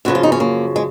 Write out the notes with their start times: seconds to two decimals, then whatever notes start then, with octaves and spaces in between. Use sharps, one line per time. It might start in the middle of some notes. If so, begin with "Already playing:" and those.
0.05 F#2 C#3 F3 F#4
0.15 F4
0.23 D#4
0.32 C#4
0.40 A#3
0.76 G#3